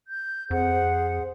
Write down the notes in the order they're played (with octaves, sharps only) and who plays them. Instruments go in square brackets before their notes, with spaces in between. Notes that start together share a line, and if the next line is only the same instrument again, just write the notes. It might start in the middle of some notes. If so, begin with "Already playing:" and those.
[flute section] G6
[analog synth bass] F2 [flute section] G#4 C5 F#5